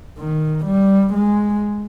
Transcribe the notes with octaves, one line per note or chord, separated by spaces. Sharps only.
D#3
G3
G#3